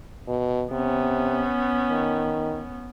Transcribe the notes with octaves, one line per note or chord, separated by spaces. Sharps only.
B2
C3 B3 C#4
D#3